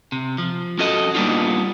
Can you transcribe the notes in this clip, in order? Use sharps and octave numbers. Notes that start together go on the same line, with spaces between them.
C3
F3
C#4 F#4 A4 D#5
G3 A#3 B3 D4 D#4 F4